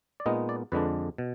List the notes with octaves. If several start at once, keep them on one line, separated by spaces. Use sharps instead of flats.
D5
A#2 G#3 B3 D#4 D#5
D5
F2 D3 G#3 D4 B4
B2